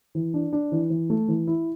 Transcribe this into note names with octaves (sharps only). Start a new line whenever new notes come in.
E3
D4
D4
E3
E3
A3
E3
E4